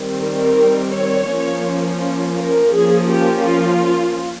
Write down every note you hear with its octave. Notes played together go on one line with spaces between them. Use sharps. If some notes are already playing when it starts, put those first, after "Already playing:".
Already playing: D#3 G3 C4
A#4
C#5
F3 A#3 C#4
A#4
F3 A#3 C#4 G#4
G4
F4